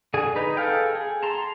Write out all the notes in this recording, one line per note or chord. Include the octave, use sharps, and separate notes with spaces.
D3 G#4 G#5
D#4 B4
G#4 A4 F5 G5
G#4
A5 A#5 C6